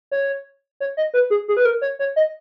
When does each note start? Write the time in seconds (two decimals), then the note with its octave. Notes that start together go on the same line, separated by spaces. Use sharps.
0.11 C#5
0.80 C#5
0.97 D#5
1.14 B4
1.30 G#4
1.48 G#4
1.57 B4
1.65 A#4
1.82 C#5
1.99 C#5
2.16 D#5